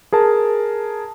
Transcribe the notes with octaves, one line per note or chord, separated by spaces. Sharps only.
G#4 A#4 A5